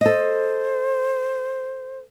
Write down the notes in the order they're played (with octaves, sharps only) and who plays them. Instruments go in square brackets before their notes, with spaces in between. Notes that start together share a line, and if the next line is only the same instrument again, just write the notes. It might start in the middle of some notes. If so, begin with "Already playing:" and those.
[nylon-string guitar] A4 D#5 [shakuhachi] C5